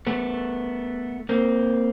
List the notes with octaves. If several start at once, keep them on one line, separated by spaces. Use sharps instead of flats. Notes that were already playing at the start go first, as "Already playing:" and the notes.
A3 B3
A#3 C4